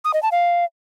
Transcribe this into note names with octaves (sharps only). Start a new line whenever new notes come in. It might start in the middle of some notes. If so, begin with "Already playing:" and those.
D#6
D#5
A5
F5